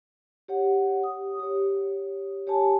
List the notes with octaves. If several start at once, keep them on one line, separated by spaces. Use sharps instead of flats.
G4 C#5 F#5
D#6
G4 C#5
G4 C#5 G#5 A5